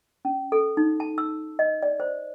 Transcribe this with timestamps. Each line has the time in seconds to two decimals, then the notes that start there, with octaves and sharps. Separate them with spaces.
0.25 C#4
0.52 A4
0.77 D#4
1.00 A5
1.18 E6
1.59 D#5
1.83 D5
2.00 C5